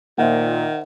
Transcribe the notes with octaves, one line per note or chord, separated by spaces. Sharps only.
A#2 D#3 C5 E5 F#5